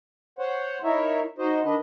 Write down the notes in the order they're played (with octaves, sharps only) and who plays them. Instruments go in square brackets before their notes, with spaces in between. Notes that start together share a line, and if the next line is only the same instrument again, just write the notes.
[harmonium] C5 C#5 F#5
D#4 E4 A#4 C#5 E5
D#4 F#4 C5 D#5
D#3 D4 B4 D#5